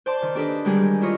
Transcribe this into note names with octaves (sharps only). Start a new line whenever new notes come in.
C5 D5 A5 C6
D#3
D4 G4 A4 B4 D5 D#5
D3 D#3 G3 G#3 G4 G#4
D4 E4 F4 C#5 D#5